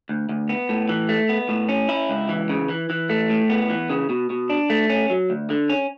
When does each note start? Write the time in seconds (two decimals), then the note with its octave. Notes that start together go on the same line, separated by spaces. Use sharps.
0.09 D2
0.29 D2
0.49 B3
0.69 A2
0.89 E3
1.09 A3
1.29 B3
1.49 A2
1.69 C#4
1.89 E4
2.10 C#2
2.29 E3
2.50 C#3
2.69 E3
2.90 E3
3.10 A3
3.30 A2
3.50 B3
3.70 E3
3.90 C#3
4.09 B2
4.30 B2
4.50 D4
4.70 A3
4.90 C#4
5.10 F#3
5.30 D2
5.50 D3
5.69 C#4